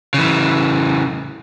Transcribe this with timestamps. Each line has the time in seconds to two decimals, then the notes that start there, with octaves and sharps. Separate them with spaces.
0.14 C#3 E3